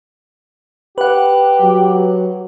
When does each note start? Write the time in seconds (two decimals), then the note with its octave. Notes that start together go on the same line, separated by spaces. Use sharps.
0.98 G4 B4 F#5
1.61 F#3